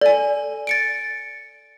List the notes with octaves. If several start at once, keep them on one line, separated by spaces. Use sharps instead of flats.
A4 D5 G#5
A6 C#7 D7